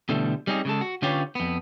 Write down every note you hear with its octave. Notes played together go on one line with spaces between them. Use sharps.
B2 D3 E3 G3 A3
G3 C4 C#4 D#4 G#4
C#3 G#3 A4
F#4
D3 C#4 F4 G4 B4 C#5
F2 B3